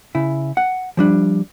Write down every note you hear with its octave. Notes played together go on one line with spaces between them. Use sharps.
C#3 E4
F#5
F3 G3 D4